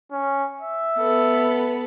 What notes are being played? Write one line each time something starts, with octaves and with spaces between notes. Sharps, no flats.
C#4
E5
B3 A4 B4